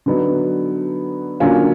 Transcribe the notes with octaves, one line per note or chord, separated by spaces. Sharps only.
D3 F#3 B3 D#4
D3 F#3 A#3 C#4 F4